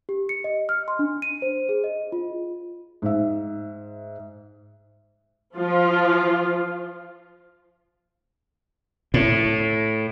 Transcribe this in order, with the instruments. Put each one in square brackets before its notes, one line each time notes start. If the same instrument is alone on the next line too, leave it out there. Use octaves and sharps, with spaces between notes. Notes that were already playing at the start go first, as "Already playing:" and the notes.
[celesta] G4
C#7
D#5
F6
C6
D4
D#7
C5
G#4
D#5
F4
[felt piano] G#2 E5
[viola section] F3 F4
[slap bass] A2